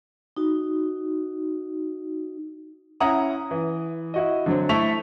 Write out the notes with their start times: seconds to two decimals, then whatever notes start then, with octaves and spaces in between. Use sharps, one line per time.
0.37 D#4 F#4
3.00 C#4 E4 F#5 A#5 D#6
3.51 E3
4.14 E4 F#4 D#5
4.46 D3 F#3 C4
4.69 A3 E4 A4 C#6 B6 F7